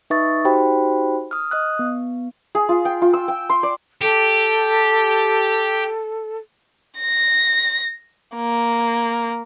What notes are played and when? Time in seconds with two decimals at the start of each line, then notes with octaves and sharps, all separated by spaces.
0.10 D#4 B4 E5 C#6 D#6 A6
0.45 D#4 F#4 G4 C5 G5 B5
1.31 D#6 F6
1.51 D#5 D#6 F#6
1.79 B3
2.55 G#4
2.69 F4
2.85 G5
3.02 F4
3.13 E6
3.28 G5
3.50 C6
3.63 D5
4.01 G4 A4
6.99 A#6
8.36 A#3